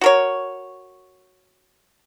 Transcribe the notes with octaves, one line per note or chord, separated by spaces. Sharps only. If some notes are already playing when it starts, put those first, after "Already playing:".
F#4 A#4 C#5